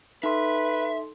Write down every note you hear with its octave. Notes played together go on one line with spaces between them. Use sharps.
D#4 A4 B4 E5 C6